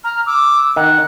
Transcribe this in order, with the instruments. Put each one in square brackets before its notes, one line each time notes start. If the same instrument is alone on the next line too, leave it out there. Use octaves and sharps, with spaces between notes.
[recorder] A#5 [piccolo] F6
[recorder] D6 [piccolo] E6
[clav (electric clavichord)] D#3 [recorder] F#5 [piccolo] F#6